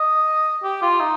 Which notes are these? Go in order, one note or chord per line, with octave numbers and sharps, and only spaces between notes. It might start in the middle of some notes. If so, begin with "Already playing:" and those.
Already playing: D#5
G4
F4
D#4